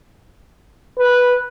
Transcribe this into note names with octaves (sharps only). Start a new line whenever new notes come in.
B4